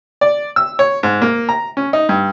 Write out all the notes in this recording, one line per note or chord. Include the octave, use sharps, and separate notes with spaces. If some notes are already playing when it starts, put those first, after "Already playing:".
D5
E6
C#5
G#2
A#3
A#5
C#4
D#4
G2